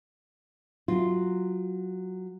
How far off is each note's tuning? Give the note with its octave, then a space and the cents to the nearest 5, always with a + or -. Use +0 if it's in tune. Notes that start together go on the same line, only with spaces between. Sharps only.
F#3 +0 F4 +0